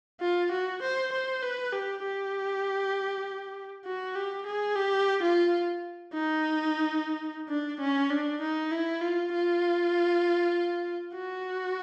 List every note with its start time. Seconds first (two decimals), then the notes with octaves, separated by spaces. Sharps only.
0.21 F4
0.52 F#4
0.82 C5
1.12 C5
1.43 B4
1.73 G4
2.03 G4
3.85 F#4
4.15 G4
4.46 G#4
4.76 G4
5.22 F4
6.13 D#4
7.49 D4
7.80 C#4
8.10 D4
8.41 D#4
8.71 E4
9.01 F4
9.33 F4
11.15 F#4